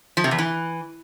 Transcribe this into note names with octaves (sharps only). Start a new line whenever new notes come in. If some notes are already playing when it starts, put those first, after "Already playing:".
F3
C3
E2
E3